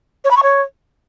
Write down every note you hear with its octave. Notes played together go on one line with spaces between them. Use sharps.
C#5
B5
C#6
C#5